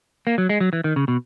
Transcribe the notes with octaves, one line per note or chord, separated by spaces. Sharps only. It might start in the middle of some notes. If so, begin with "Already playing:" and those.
A#3
F#3
G#3
F#3
E3
D#3
C#3
B2